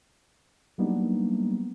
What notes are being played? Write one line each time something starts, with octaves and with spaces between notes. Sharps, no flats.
F#3 G3 A#3 B3 D4 D#4